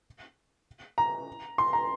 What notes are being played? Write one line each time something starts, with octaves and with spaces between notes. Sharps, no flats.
A#5
C6
A#5